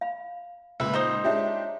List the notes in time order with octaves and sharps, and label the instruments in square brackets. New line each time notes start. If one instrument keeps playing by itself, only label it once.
[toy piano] F5 B5
[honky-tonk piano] C#2 A#2 [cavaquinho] B4 E5
[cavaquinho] D#4 C5 D#6
[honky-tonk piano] G#3 D4 G4 [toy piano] F4 C#5 E5